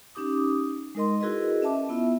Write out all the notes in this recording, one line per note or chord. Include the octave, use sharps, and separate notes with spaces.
C#4 D#4 G4 D6 D#6
G#3 D#4 A#4 D#5 C6
E4 F#4 G#4 A#4 B4 D#5
C#4 D#5 E5 A5 D6
B3 E4 F4 E5